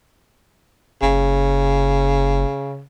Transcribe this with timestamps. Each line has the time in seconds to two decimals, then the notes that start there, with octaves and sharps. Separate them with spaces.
1.02 F#1 C#3